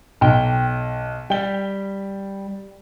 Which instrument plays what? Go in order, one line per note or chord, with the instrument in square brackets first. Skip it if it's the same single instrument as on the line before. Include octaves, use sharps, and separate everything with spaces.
[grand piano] B1 [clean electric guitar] G5
[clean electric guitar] G3 [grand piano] G5 G7